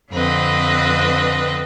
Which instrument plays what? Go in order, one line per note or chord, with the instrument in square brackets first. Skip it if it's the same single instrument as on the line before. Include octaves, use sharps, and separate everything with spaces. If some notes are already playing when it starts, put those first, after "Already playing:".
[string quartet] F2 D3 C4 B4 D#5